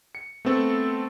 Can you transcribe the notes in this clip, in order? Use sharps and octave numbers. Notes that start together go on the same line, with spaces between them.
C#7
A3 B3 C4 A4